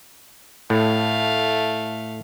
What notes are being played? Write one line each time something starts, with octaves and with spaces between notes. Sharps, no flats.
A2 A3 F5